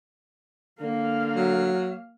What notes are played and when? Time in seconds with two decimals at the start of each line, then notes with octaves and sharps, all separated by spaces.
0.81 D3 A#3 F5
1.36 F#3